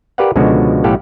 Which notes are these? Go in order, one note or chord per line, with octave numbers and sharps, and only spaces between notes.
G4 A#4 B4 D5 F5 F#5
C#2 B2 D3 F3 G#3 F#4
B1 A2 G4 A4 F5 F#5